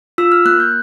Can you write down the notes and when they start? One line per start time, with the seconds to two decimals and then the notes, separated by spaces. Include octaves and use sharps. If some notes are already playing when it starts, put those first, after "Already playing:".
0.18 F4 E6
0.32 F6
0.45 A#3 F#6
0.60 G6